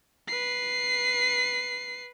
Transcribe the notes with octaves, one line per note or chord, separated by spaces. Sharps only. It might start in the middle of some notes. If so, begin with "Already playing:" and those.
B4 C7